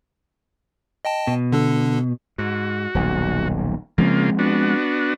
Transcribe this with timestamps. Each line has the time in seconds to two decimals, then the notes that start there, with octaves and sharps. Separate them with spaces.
1.05 D#5 G5 A5
1.27 B2
1.52 D3 D4 A4
2.38 G#2 F#4
2.95 D#1 B1
3.98 C#3 F3 G#3 A#3 C4 F4
4.39 B3 D4 F#4